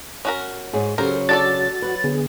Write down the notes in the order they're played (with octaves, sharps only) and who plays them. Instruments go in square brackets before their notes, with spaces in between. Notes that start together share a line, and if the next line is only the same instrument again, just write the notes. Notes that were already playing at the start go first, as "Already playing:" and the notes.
[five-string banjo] C#4 F#4 A#4
[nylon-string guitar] G#2 G#4 C#5
[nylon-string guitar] C#3 F#3 [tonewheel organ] G4 A4 [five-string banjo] A#4 C5
[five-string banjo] D4 A4 D5 [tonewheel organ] F#4 [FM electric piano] A6
[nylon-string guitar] F#3 B4
[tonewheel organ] D3 B3 G#4